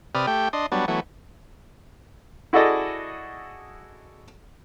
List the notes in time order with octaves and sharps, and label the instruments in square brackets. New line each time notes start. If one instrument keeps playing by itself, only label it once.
[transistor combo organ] C3 B4 D5 D#6 F6
A3 G4 G5
D4 D#5 C6
F#3 G3 B3 D4
E3 F#3 A3 B3
[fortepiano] E4 F#4 G#4 A4 D5 D#5